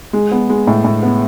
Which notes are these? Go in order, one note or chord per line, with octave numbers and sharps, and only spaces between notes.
G#3
B3
G#3
A2
A2
B3